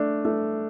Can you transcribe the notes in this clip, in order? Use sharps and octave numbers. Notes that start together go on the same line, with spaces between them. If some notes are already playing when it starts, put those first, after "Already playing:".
Already playing: A3 D4
A3